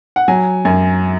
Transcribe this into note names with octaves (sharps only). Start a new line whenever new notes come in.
F#5
F#3 G#5
F#2 G#5